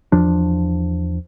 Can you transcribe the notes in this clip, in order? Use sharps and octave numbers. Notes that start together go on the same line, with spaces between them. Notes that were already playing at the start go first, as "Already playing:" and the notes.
E2 F3 D4